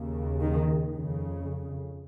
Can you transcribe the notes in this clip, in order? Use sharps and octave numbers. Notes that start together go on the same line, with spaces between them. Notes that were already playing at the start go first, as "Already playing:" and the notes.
Already playing: D#2 C#3
D#3
F2 C#3